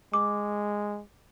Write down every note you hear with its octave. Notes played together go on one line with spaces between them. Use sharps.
G#3 D6